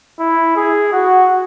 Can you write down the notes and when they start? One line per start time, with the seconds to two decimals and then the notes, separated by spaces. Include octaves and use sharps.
0.19 E4
0.56 G#4
0.92 F#4